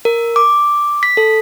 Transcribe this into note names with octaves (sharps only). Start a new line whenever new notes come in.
A#4
D6
B6
A4